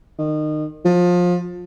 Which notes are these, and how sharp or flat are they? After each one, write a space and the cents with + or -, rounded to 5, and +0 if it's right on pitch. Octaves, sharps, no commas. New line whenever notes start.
D#3 -25
F3 +25